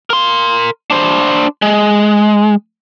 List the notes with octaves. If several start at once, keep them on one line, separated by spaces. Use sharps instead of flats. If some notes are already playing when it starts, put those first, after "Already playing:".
A#4 C6
D4 C5
G#3